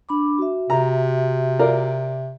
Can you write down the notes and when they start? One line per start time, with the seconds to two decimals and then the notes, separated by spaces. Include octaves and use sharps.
0.09 D4 B5 D6
0.39 F#4 E5
0.70 C3 A#5
1.59 F4 A#4 D5